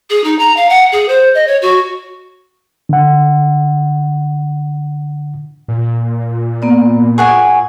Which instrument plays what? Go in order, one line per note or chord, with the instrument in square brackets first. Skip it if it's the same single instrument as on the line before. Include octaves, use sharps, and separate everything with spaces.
[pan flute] G#4
D#4
A#5
F5
F#5
G#4
C5
D#5
C#5
F#4
[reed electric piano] D3 F#5
[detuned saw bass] A#2
[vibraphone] A#3 B3 D5
[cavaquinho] G#4 F#5 G#5 [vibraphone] C#6